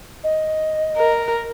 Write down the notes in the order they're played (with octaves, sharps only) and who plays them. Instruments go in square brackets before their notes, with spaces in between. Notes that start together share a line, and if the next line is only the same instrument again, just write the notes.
[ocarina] D#5
[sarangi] A#4